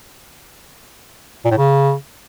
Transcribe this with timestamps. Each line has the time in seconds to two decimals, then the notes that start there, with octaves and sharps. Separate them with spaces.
1.45 A#2
1.51 A2
1.57 C#3